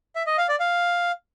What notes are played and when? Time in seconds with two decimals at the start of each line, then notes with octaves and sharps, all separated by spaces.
0.16 E5
0.27 D#5
0.38 F5
0.49 D5
0.60 F5